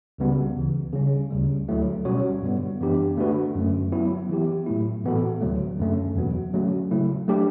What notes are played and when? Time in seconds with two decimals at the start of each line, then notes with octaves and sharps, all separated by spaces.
0.18 C#2 C#3 G3 B3 F#4
0.55 D2 C#3 E3
0.93 C#3 G3 C#4
1.31 D2 C#3 G3
1.68 D2 D3 F#3 A3 E4
2.05 B2 G3 C#4 F#4 C#5
2.43 G2 D3 G3 B3
2.80 F#2 E3 B3 D4 G4
3.17 D3 A3 D4 F#4 B4
3.55 F#2 D3 A3
3.92 F#3 B3 E4
4.30 E3 B3 E4 G4
4.66 A2 F#3 A3 E4
5.04 A2 E3 B3 F#4 A4
5.41 D2 D3 F#3 A3
5.79 F#2 D3 A3 C#4
6.16 E2 B2 F#3 B3 F#4
6.53 D3 F#3 A3 C#4 F#4
6.91 C#3 F#3 A3 E4
7.28 F#3 A3 D4 G4